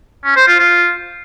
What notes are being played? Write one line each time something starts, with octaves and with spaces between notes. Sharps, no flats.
C#4
C5
F4
F4